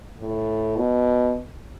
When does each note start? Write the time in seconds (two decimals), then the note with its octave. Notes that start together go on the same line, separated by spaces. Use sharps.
0.20 A2
0.76 B2